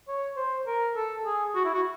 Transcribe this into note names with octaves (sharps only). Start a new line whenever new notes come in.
C#5
C5
A#4
A4
G#4
F#4
E4
F#4